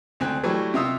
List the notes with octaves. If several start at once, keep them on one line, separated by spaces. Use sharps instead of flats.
D2 C4 G#5 F#6
E3 F#3 G3 A3 F#4
C3 F4 E5 F5 D#6 E6